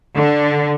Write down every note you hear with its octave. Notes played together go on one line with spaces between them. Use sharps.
D3